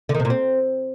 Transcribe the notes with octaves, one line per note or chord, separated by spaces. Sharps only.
D3
D#3
C3
A#2
C4